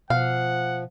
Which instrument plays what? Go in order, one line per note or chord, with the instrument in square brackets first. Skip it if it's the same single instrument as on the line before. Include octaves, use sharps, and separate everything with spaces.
[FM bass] B2 [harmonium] F3 [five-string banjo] F5 [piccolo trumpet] F#5